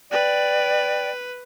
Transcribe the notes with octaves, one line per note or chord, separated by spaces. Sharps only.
B4 D5 G5